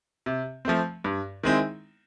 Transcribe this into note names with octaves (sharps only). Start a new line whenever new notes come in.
C3
F3 A3 C4
G2
D#3 G#3 C4 E4